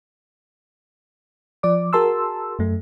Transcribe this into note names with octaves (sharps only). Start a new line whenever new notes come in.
F3 D5 D6
F#4 G#4 A#4 A5 C6 E6
F#2 A3